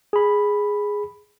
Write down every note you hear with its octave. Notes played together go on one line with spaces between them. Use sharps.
G#4 B5